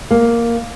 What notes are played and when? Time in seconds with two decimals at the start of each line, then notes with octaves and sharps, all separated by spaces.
0.11 A#3